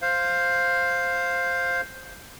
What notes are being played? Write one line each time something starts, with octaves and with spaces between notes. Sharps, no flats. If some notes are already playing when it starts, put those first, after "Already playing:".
C5 F5